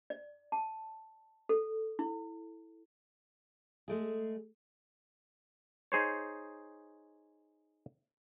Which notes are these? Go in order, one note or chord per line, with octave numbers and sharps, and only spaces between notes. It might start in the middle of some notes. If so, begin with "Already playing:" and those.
D5
A5
A4
E4
G#3 A3 G#4
D#4 G#4 C5 C#5